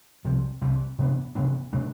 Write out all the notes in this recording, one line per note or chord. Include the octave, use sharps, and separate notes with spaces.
C2 C3 F3
C2 C3 E3
C3 E3 B3 D4
C3 E3 B3 D4
B2 A3 D4